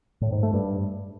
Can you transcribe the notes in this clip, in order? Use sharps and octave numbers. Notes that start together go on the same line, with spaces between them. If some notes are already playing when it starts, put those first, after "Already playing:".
A2
G#2
A3
G2